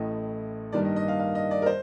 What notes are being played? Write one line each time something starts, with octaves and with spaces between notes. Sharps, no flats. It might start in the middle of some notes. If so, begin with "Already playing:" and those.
Already playing: A1 A2 A3 D#5
G2 D#3 G3 A#3 D5
D#5
D#5
F5
F5
D#5
D5
A#4
C5